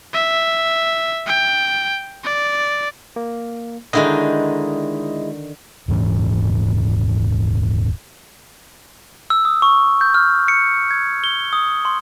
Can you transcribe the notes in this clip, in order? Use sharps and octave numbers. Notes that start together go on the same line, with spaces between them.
E5
G5
D5
A#3
D3 D#3 G#3 D#4 E4 D#5
D#1 G#2 E3 C#4
E6
D#6
C#6
G6
F6
C#7
G#6
G7
D#6
C6